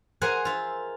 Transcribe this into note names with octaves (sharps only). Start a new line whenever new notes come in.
G#4 A#4 C5 F5 F#5 G#5
F4 E5